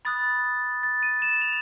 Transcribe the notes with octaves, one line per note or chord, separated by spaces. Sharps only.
B5 D#6 F#6 A6
A6
D#7
E7
F7